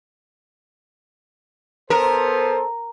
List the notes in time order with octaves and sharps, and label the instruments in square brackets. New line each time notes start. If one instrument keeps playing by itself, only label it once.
[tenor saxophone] B3 [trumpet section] A4 C5 [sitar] A#4 [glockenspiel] A#5